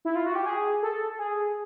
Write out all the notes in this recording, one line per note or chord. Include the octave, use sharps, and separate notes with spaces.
E4
F4
F#4
G4
G#4
A4
G#4